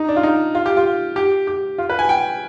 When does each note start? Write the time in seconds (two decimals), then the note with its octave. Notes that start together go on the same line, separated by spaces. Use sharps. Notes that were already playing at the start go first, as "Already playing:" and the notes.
Already playing: D#4
0.09 D4
0.16 F4
0.23 D#4
0.55 F4
0.66 G4
0.77 F4
1.16 G4
1.47 G4
1.78 F4
1.90 B4
1.99 G#5
2.09 G5